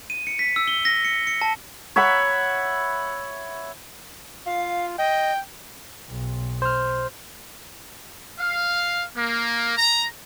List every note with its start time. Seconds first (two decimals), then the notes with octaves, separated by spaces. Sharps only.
0.10 D#7
0.27 C#7
0.39 B6
0.56 E6
0.68 G7
0.85 A#6
1.05 C#7
1.27 C#7
1.42 A5
1.96 C#5 E5 F#5 B5
4.46 F4 F5
4.98 D#5 G5
6.09 B1
6.62 C5 F6
8.38 F5
9.16 A#3
9.77 A#5